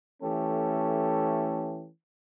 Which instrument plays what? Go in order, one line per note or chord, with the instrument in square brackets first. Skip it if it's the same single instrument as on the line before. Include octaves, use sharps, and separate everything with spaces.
[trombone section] E3 A3 C#4 G4 A4